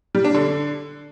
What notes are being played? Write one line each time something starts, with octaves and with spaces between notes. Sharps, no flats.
G3
D4
D3